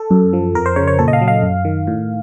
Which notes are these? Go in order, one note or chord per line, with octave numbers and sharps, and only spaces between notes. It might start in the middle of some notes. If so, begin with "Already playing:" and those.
Already playing: A4
F#2
F3
F2 A#4
C5
C#3 C#5
C#5
A#2 A4
D#5
F5
F#3
F5
F#2
D#3
A2